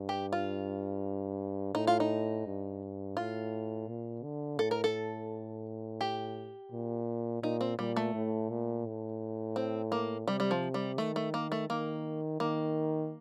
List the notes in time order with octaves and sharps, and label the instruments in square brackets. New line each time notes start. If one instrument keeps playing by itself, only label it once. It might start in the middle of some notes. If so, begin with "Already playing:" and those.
Already playing: [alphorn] G2
[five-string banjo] G4
F4
[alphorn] A2 [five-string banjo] D#4
[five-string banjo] F4
D#4
[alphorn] G2
[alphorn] A2 [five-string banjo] F4
[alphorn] A#2
D3
[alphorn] A2 [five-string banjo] A4
[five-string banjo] A#4
A4
G4
[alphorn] A#2
[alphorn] A#2 [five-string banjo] D#4
[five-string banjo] C4
[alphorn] A#2 [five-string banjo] G3
[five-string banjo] A3
[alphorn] A2
A#2
A2
[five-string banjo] C4
A#3
[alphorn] C3 [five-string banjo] G3
[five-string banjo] G3
F3
G3
[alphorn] D#3 [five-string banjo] A3
[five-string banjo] A3
A#3
A3
[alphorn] D#3 [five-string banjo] A#3
[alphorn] D#3 [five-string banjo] A#3